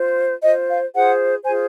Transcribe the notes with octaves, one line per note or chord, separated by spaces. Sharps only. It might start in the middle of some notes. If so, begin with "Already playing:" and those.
Already playing: F4 C5
F4 C5 D#5
F5
F4 G#4 C5 F#5
F4 G#4 C5 G#5